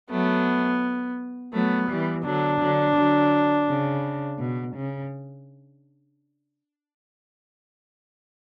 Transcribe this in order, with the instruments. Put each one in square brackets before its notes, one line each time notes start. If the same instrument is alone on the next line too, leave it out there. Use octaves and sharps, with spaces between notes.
[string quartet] F#3 A3 [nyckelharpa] B3
[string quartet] F#3 A3 [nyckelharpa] B3
[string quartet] E3 G3
[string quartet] D3 F#3 [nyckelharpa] D4
[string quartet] D3 F#3
D3 F#3
C#3
B2
C#3